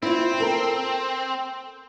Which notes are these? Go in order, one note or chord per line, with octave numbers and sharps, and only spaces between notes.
C4 E4 F4
A4 A#4